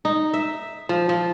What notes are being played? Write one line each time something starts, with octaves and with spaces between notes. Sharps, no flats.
D#4
E5
F3
F3